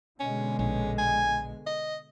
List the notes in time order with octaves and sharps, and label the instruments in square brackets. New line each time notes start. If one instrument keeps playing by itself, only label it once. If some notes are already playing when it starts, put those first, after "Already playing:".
[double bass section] B2 D3 G#3 [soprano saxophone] C#4
[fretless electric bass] A#1 [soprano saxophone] C#4
[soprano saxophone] G#5
D#5